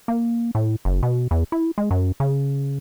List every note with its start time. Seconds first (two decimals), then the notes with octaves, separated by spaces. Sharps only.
0.08 A#3
0.55 A2
0.85 F#1
1.03 B2
1.31 E2
1.52 E4
1.78 G#3
1.91 F#2
2.20 C#3